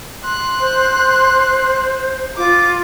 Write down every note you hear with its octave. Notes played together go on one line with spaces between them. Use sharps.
C6 F#6
C5
F4 D6